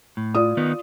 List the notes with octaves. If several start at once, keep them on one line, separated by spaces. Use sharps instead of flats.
A2
F4 D5 D#6
D#3 B3 D#4